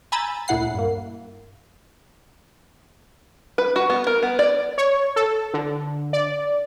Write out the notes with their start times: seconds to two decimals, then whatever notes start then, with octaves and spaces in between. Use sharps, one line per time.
0.12 G#5 A#5 B5 E6 G6 A6
0.48 D2 A#2 E4 F#5 C7
0.74 G2 A#3
3.58 B4
3.76 F#4
3.90 B3
4.07 A#4
4.23 B3
4.39 D5
4.78 C#5
5.16 A4
5.54 D3
6.13 D5